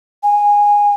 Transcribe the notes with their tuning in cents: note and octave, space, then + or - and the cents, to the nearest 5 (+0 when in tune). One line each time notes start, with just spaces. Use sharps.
G#5 -15